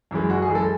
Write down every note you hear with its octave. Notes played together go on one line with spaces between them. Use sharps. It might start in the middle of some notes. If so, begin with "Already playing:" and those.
F#2 E3 G#3
F#1 F#4
G#4
F#2 E3 G#3
A4